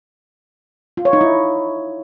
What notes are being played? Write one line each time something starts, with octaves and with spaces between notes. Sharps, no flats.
F4
C#5
D#4
E4